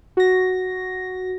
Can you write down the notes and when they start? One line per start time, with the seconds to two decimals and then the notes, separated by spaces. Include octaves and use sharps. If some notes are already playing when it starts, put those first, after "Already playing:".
0.17 F#4 A#6